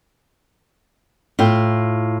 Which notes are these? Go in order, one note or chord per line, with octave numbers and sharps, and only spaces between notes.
A2 F4 G5